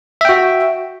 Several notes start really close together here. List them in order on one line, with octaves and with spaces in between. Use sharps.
E5 G5 F#4